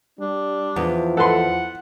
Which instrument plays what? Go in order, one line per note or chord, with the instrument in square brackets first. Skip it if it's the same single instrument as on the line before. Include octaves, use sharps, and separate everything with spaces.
[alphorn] G3 [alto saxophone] D4
[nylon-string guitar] E2 [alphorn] F3
[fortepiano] A4 B4 C6 [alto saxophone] F#5